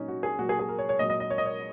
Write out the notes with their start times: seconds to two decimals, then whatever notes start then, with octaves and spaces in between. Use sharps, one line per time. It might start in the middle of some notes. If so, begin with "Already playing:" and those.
Already playing: A#2 F#3 C#4 D#4
0.08 F#4
0.23 G#4
0.39 A#2 F#3 F#4
0.49 G#4
0.59 G#4
0.69 A#4
0.79 C#5
0.89 C#5
0.99 A#2 F#3 D#5
1.10 D#5
1.20 D#5
1.30 C#5
1.38 D#5
1.46 C#5